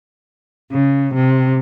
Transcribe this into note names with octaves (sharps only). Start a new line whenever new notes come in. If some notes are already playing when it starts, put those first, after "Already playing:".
C#3
C3